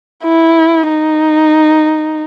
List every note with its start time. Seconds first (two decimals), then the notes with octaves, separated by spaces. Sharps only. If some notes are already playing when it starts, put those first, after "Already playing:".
0.24 E4
0.89 D#4